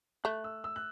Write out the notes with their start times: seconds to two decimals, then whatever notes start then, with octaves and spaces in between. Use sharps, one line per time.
0.24 A3 F#6
0.44 E6
0.64 E6
0.76 F#6